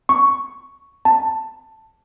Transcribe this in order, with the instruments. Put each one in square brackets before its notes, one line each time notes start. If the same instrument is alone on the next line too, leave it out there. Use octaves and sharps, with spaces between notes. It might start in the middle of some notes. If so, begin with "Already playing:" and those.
[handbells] C#6
A5